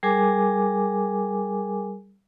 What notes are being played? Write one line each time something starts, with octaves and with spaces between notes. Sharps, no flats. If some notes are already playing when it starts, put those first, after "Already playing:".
G3 G#4 A#4 G#5 D6